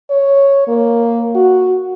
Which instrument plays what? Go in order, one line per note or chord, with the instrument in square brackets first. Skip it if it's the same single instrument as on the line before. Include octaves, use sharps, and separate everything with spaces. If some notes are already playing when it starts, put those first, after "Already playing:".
[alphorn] C#5
A#3
F#4